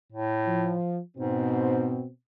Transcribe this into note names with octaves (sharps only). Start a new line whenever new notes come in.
A2
F3
G#2 B2 C4